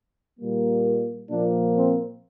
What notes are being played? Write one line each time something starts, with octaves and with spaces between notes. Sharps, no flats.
A#2 G3 A#3
A#2 F3 A#3 D4
C4